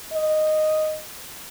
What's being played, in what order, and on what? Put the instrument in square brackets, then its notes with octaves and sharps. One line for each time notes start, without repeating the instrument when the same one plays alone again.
[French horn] D#5